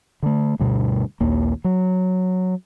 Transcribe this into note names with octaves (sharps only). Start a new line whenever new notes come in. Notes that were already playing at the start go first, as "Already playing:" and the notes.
D3 A3
D2 G2 B2
A#1 D#2 A#3
F#3